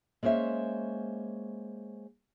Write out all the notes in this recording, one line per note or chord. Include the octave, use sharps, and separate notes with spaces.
G#3 A#3 C#4 C5 E5